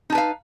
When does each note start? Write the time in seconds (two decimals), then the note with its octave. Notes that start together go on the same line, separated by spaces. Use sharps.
0.10 D#4
0.12 A5
0.15 B4
0.18 F5